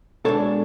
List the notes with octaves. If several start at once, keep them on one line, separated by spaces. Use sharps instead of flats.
B2 G#3 D4 A4 C#5